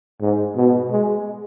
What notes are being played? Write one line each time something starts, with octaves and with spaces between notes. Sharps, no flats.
G#2
B2
G#3